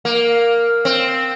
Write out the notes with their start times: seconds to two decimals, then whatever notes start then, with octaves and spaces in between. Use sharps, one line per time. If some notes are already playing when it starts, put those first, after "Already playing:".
0.05 A#3
0.85 C4